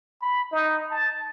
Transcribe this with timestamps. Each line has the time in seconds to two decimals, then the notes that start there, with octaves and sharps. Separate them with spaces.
0.22 B5
0.52 D#4
0.91 A5